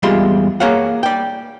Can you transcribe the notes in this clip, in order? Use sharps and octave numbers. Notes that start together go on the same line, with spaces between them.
E2 G3 G#3 F4 G#4 C6
A#3 G#4 C#5 F5 F#5
D5 G5